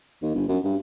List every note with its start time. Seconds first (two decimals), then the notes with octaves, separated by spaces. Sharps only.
0.22 D#2
0.34 G1
0.48 F#2
0.64 G2